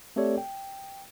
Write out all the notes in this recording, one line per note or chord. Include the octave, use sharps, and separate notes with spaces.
A3 C4 G4 A4 C#5 D5
G5